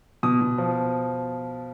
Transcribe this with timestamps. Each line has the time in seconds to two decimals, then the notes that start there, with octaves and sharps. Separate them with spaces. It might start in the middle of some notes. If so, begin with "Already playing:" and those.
0.23 B2 D#6
0.41 B2
0.58 F3